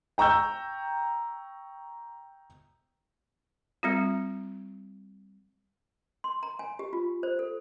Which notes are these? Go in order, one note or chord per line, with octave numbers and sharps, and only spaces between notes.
G5 A#5 C#6 E6 G6
G3 C4 F4
C6
A#5
G#5
G4
F4
C5
A4